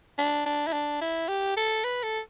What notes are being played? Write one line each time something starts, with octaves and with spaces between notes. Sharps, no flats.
D4
D4
E4
D4
E4
G4
A4
B4
A4